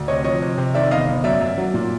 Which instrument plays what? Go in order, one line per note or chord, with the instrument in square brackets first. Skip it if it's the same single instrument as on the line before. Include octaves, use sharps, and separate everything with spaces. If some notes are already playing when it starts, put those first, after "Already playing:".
Already playing: [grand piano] D2
C3 C#5 D#5
F3 C#5 D#5
C3
C3
D#3 D5 E5
G1 D#5 F5
G1
F#2 D5 E5
F#2
F#3
A#2